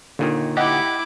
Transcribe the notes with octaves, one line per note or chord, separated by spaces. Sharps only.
D#2 A#2 D3 D#3
E4 G4 D#5 F#5 D6